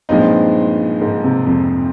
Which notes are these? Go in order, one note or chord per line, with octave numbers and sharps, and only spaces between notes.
G2 A#2 F3 G#3 C4 D#4
G#2
C3
F2